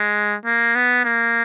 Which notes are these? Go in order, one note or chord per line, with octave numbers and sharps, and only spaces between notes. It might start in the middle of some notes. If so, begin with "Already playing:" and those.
Already playing: G#3
A#3
B3
A#3